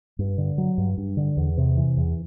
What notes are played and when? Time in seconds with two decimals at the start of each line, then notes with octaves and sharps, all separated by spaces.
0.19 G2
0.38 D3
0.58 F#3
0.78 G2
0.98 G2
1.17 D3
1.37 E2
1.57 C3
1.77 E3
1.97 E2